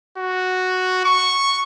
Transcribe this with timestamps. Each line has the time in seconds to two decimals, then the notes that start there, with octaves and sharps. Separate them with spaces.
0.18 F#4
1.05 C#6